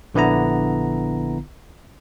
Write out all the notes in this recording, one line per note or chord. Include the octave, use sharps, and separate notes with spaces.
A#1 D3 B3 E4 A#5